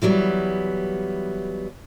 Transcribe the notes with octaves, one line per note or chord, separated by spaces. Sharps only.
E3 F#3 G3 B3